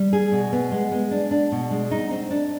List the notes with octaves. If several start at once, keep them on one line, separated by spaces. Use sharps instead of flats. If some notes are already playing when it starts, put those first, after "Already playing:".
Already playing: G3
G#4
B2
B3
G#3
G#3
D4
D4
B2
G#3
D#4
C4
D4